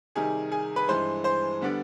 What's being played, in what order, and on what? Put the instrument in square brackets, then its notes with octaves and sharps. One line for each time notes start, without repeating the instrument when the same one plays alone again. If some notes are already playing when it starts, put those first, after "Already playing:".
[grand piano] C3 D#3 G3 G#4 G#5
G#4 G#5
B4 B5
G2 E3 G#3 C5 C6
C5 C6
D3 G3 B3 D4